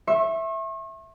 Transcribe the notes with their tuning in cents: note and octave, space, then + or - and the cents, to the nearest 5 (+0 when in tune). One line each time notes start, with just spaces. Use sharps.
E5 +0 C#6 -40